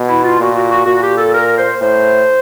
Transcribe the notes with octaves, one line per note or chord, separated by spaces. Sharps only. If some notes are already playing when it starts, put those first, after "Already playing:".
Already playing: B2
E4
F4
A#2 F#4
F#4
F#4
A#2 F#4
G4
A4
A#4
C5
A2 C5